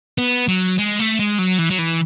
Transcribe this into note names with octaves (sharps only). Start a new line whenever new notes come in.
B3
F#3
G#3
A3
G#3
F#3
E3
F#3
E3